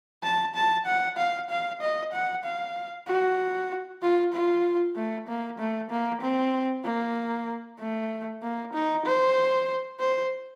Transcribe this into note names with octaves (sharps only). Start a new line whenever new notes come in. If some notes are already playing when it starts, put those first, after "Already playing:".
A5
A5
F#5
F5
F5
D#5
F#5
F5
F#4
F4
F4
A3
A#3
A3
A#3
C4
A#3
A3
A#3
D#4
C5
C5